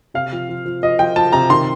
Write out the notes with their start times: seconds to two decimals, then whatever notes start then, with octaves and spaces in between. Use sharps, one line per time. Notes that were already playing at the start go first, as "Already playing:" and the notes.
0.14 C3 F5
0.32 F3
0.49 F3
0.65 F3
0.83 F3 D#5
0.99 F3 G5
1.16 F3 A5
1.32 C3 A#5
1.50 D#3 C6